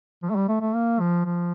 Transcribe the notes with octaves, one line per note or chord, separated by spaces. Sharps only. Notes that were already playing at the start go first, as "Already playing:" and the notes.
F3
A3
G3
A3
A3
A#3
F3
F3